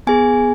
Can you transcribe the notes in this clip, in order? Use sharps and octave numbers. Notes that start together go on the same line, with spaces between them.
B3 G#4 G#5